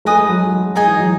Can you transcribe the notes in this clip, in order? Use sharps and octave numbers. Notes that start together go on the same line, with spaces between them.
A3 B4 D#5 G#5 D#6
G#3
F#3
G#3
G#3 D#4 G#4 D#5 G#5
E3
F#3